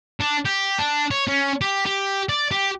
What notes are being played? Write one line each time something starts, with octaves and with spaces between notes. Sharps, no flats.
D4
G4
D4
C#5
C#4
G4
G4
D5
G4